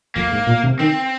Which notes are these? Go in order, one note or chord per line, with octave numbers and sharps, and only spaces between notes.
F2 A#3
G#2
A#2
C3
D#3 C4